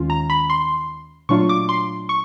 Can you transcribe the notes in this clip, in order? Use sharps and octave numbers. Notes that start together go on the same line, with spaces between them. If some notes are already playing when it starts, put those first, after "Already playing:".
Already playing: D#2 D#3 G#3 C#4 F4
A#5
B5
C6
A#2 F#3 A3 D4 F4 C#6
D6
C6
C#6